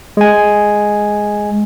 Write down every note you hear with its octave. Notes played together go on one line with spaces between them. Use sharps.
G#3 G#5